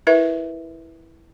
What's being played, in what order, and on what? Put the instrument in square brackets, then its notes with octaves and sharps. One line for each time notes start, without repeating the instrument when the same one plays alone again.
[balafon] E4 A#4 B4 E5